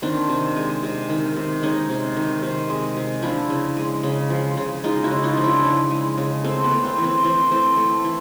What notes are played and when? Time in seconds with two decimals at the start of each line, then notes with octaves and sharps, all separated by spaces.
0.02 D#3 C4 D4
0.29 C3
0.56 G#3
0.83 C3
1.10 D#3
1.37 C3
1.63 G#3 C#4 D#4
1.90 C3
2.17 D#3
2.43 C3
2.70 G#3
2.97 C3
3.22 F3 D4 E4
3.50 C#3
3.77 G#3
4.03 C#3
4.30 F3
4.57 C#3
4.84 G#3 D#4 F4
5.04 E4 F#4
5.11 C#3
5.24 D#4 F4
5.37 F3
5.44 D4 E4
5.64 C#3
5.90 G#3
6.18 C#3
6.44 A3 C4
6.64 B3
6.71 A3
6.85 C4
6.98 E3
7.04 C4
7.24 E3 C4
7.51 A3 C4
7.77 A3
8.04 E3